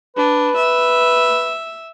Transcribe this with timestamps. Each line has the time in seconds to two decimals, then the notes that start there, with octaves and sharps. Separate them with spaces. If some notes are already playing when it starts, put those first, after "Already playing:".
0.17 D4 B4
0.56 E5